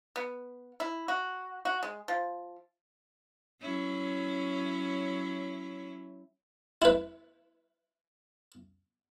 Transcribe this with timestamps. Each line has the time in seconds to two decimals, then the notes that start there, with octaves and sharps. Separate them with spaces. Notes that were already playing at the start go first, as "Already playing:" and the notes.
0.16 B3
0.80 E4
1.08 F#4
1.65 F#4
1.83 G#3
2.08 F3
3.61 F#3 C#4 E4
6.82 E4 B4